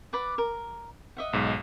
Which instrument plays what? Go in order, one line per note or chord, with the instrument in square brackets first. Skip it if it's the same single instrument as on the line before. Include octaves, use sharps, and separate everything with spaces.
[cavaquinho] B4 D5 F#5
A#4
D#5 E5 F#5
[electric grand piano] B1 G#2